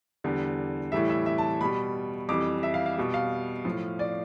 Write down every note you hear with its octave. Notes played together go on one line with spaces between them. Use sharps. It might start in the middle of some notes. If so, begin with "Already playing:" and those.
E2 D3 G3
A2 E3 G3 E5
E5
E5
A5
B2 G3 B5
F2 E3 G3 D6
E5
F5
F5
B2 G3
F5
A2 F3
D5